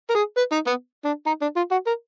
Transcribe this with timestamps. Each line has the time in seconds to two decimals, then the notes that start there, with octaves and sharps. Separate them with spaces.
0.10 A#4
0.15 G#4
0.37 B4
0.52 D#4
0.67 B3
1.05 D4
1.26 D#4
1.41 D4
1.56 F4
1.71 F#4
1.87 A#4